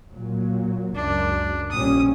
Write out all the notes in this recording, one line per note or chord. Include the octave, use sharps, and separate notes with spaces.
A#2 F#3
C#2 F#2 D4
A#1 G3 C#4 D#6